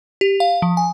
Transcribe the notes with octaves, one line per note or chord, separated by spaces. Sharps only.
G4
F5
F3
G#5